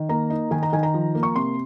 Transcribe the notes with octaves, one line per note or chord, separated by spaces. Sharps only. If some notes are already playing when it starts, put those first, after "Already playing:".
Already playing: D#3
A#3 A#5
D#4
D#3 G#5
A#5
D#3 G#5
A#5
F3
A#3
C#6
C3 C6